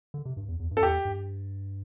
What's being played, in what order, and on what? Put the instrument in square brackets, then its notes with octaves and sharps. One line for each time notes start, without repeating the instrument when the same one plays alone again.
[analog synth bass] D3
C3
G2
E2
E2
G2
[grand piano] A4
[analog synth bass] E2 [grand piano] G4
[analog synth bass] G2